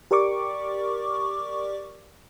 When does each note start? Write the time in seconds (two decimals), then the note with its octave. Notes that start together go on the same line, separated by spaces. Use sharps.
0.11 G4 A#4 D5 C#6 D6